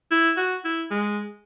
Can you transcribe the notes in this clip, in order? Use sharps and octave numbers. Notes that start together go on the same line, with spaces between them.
E4
F#4
E4
G#3